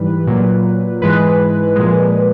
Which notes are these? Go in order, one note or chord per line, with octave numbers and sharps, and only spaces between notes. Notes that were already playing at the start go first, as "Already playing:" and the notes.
Already playing: G#2 E3 G3 B4
A#2 F#3
G#2 E3 G#3 B4
A#2 F3 G#3